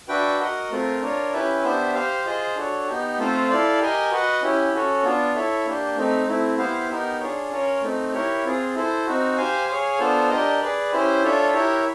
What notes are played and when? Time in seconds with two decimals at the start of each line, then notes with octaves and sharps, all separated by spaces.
0.09 D4 F#4 B4 E5 G5
0.40 F#4 A#4 D#5 F#5
0.71 A3 C4 F4 A#4
1.02 D4 F4 A#4 C#5
1.33 C#4 E4 G4 B4 E5
1.63 B3 D4 G4 C5 E5
1.94 G4 C5 F5
2.26 F4 G#4 C5 D#5
2.56 D4 F#4 A4 C#5
2.87 B3 D#4 G4
3.18 A3 C4 F4 A4 C5
3.49 E4 A4 D5 F5
3.80 G4 A#4 D#5 G#5
4.11 F#4 B4 D#5 F#5
4.42 C#4 E4 G4
4.73 C#4 F#4 A4 C#5
5.03 B3 D4 F4
5.35 E4 A4 C#5 E5
5.66 A#3 D4 G4
5.97 A3 C4 D#4
6.27 A3 C4 E4
6.58 B3 E4 G4 C5 F5
6.90 B3 D#4 G4 A#4
7.20 D4 F4 G#4 C#5
7.51 C#4 F4 A#4 C#5
7.82 A3 C4 D#4
8.13 E4 G4 A#4 C#5
8.45 C4 F4 G#4
8.75 E4 A4 C5
9.06 C4 D#4 F#4
9.37 G4 C5 F5 G#5
9.67 G#4 C#5 F5 G#5
9.99 B3 D4 F4 A4 C5
10.29 D4 G4 A#4 D#5
10.61 G#4 B4 D5
10.92 C#4 E4 G4 C5
11.23 D4 F4 A4 C#5 E5
11.54 E4 G4 A#4 C#5 E5